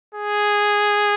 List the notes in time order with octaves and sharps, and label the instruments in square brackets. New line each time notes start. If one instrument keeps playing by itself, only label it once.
[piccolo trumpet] G#4